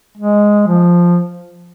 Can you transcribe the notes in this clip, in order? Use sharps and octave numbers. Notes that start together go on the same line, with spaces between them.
G#3
F3